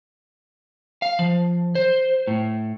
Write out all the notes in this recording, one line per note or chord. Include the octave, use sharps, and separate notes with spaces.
F5
F3
C5
A2